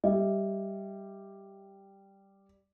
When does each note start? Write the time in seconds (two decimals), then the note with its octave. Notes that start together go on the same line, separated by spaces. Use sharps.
0.04 G3 D#5 E5